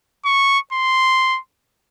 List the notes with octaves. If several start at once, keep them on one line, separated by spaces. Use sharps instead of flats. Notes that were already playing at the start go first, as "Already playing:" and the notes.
C#6
C6